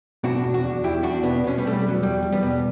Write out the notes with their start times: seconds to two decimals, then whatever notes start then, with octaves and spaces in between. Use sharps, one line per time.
0.24 B2 D4 F#4
0.44 E2
0.54 D4 F#4
0.64 E2
0.83 E2 E4 G4
1.03 E2 D4 F#4
1.23 B2 B3 D4
1.44 B2 C#4
1.58 G3 B3
1.63 B2 A3
1.73 G3
1.83 E2
1.88 F#3
2.02 E2 G3
2.23 E2
2.32 G3 B3
2.43 B2